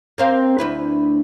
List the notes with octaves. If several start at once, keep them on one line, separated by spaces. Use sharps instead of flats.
A#3 C4 F5
D2 E4 B4